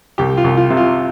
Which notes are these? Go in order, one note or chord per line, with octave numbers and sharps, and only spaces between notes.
C2 G4
F4
C2
F4
C3
F4